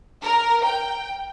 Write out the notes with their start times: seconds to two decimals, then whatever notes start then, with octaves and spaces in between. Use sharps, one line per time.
0.24 A#4
0.66 G5